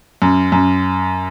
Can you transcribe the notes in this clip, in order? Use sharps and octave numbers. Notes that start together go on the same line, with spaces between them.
F#2
F#2